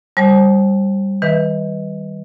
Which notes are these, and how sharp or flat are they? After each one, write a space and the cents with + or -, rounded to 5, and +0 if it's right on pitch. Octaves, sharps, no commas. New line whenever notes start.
G3 +0 C5 +30 A5 -40
D#3 +25 B4 +0 E5 +0